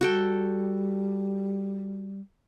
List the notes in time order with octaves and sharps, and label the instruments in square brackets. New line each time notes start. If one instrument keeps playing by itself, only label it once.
[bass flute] G3 [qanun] F#4 A4 G5